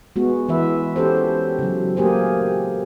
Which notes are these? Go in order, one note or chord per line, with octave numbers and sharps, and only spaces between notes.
G#3 B3 F#4
E3 B4 E5
C#4 G4 A4 C5
C#3 F#3
A3 A#3 G4 G#4 C5